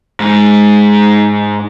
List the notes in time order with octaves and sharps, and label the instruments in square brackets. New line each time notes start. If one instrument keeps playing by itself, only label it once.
[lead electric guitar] G#2 G#3